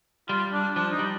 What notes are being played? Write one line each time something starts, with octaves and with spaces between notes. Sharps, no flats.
G3 F4
D4
F3 D4
D#4
G3